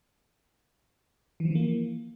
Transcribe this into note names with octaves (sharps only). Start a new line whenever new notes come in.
E3
F3
E3
A#3